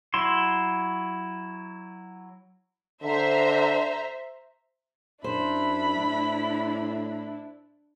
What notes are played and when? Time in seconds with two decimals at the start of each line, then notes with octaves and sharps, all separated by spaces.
0.14 F#3 E4 C6
3.03 D3 C5 E5 A#5
5.24 F#2 D4 E4 C5 B5
5.98 A2